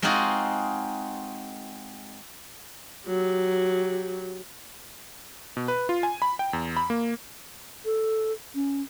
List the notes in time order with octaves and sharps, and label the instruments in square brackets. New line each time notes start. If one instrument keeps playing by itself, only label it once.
[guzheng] G#3 C4 D#4 F4 F#4 G#4
[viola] F#3 G4
[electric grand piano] B2
B4
F4
G#5
B5
G5
E2
B5
A#3
[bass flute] A4
C#4